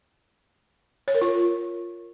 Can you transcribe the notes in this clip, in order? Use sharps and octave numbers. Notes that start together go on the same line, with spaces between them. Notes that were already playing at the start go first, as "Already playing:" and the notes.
C#5
A#4
F4